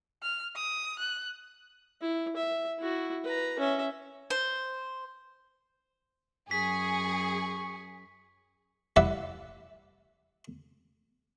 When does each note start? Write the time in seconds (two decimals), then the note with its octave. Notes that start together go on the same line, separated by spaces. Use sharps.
0.23 F6
0.55 D#6
0.99 F#6
2.01 E4
2.36 E5
2.79 E4 F#4
3.24 B4 A#5
3.59 C#4 E5
4.30 C5
6.51 F#2 G#4 C#6 B6
8.96 G3 E4 D5 E5 F#5